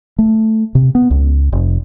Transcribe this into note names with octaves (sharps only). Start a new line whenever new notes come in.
A3
C3
B3
C#2
F1